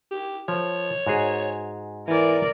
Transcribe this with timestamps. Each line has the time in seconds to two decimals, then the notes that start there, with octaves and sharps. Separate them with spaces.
0.11 G4
0.48 F3 C#5
1.07 G#2 F#4 G#4
2.08 E3 A#4 D5